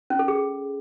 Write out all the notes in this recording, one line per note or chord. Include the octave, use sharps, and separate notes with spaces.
C#4
A4
G#4